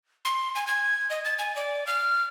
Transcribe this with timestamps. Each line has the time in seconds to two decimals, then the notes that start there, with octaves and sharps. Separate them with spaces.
0.25 C6
0.55 G#5
0.67 G#6
1.10 D#5
1.25 A6
1.39 G#5
1.56 D5
1.87 F6